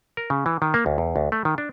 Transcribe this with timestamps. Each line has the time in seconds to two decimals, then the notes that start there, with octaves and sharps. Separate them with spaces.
0.17 A#4
0.30 C#3
0.46 E3
0.62 D#3
0.74 A#3
0.86 D2
0.98 E2
1.16 D2
1.32 A3
1.45 D#3
1.58 D4